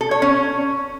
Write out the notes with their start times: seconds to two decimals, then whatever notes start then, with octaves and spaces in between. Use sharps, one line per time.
0.01 A4
0.11 C#5
0.22 C#4